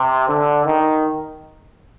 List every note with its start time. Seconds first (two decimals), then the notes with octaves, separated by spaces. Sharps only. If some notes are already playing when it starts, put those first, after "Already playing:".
Already playing: C3
0.28 D3
0.66 D#3